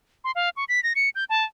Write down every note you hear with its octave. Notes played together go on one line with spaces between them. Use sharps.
C6
F5
C#6
B6
A#6
C#7
G6
A5